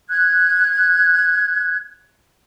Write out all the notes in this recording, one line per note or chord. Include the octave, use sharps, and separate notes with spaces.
F#6 G#6